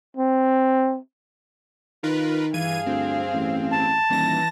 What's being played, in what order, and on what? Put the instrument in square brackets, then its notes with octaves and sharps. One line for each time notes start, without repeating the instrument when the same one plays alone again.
[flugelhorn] C4
[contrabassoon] D#3 [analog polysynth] F4 A#4 B4
[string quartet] G2 G#4 F5 [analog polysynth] E3 G#6 D#7
[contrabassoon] D2 [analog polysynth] C4
[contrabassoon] A1
[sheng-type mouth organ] A5
[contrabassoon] D#1 [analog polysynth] E3 A#6 [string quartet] A6